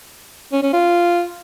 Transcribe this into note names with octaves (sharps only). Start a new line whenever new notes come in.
C#4
C#4
F4